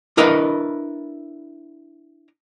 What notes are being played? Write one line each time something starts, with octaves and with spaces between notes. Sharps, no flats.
D4 E4 A#4 B4 D#5 F5